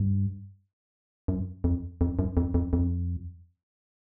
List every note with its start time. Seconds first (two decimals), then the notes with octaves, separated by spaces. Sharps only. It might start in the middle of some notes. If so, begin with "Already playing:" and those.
Already playing: G2
1.28 F#2
1.64 F2
2.01 F2
2.19 F#2
2.37 F2
2.54 F2
2.73 F2